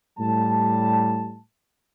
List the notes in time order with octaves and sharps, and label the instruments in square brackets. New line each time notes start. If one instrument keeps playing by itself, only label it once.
[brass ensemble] A2 G3 A5